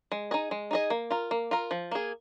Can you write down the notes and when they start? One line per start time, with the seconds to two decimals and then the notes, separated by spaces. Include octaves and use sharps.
0.12 G#3
0.31 D#4 G#4 D#5
0.51 G#3
0.71 D#4 G#4 D#5
0.90 A#3
1.10 F4 A#4
1.31 A#3
1.51 F4 A#4
1.71 F3
1.91 A#3 G#4